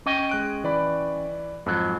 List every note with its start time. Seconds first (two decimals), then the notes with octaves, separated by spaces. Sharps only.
0.06 C#4 D#5 G5
0.29 G#3 F#6 D7
0.64 E3 D5 B5
1.66 F2 G#2 F#3